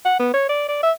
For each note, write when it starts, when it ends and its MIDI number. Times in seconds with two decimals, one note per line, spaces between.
0.05 0.17 78
0.19 0.29 59
0.34 0.47 73
0.49 0.67 74
0.68 0.78 74
0.83 0.92 76